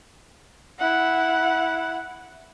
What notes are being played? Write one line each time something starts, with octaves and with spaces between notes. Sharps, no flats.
E4 F#5